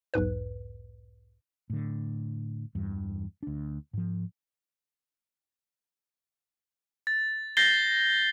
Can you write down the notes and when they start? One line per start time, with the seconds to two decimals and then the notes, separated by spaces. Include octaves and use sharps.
0.14 B1 E2 G#2 B4
1.70 A2 D3
2.75 E2 G2 E3
3.43 D2 D4
3.93 G#2 F3
7.07 A6
7.57 G6 A6 A#6 C7 G7